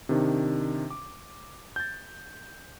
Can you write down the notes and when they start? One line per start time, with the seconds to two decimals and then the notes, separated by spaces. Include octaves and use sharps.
0.09 C3 D#3 D4
0.90 D6
1.76 G6 A6